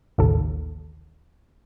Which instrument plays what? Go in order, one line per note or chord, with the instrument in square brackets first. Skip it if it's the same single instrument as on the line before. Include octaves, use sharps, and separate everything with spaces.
[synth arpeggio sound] A1 D#2 C#3 A4